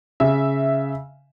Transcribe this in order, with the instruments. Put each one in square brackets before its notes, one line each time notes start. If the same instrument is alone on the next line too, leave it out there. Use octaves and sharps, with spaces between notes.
[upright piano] C#3 E5